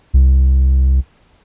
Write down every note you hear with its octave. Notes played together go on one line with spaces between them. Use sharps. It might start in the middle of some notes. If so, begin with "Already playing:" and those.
C2